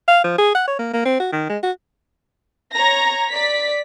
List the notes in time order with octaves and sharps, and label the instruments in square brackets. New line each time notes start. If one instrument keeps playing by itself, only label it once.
[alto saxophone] F5
F3
G#4
F#5
C#5
A#3
A#3
C4
F#4
D#3
G#3
F#4
[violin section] C#5 A#5 A#6
D5 B6